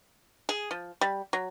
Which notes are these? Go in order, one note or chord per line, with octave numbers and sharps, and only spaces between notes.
G#4
F3
G3
F#3